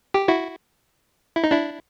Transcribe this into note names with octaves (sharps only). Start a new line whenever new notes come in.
G4
E4 F#4
E4
D#4
D4 E4